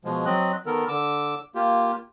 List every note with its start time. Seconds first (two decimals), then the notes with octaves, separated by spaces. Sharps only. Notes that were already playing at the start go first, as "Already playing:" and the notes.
0.05 B2 F3 G#3
0.26 F#3 C4 D#5 F#6
0.66 D#3 B3 A4 A#4
0.88 D3 D6 E6
1.55 A#3 F4 G4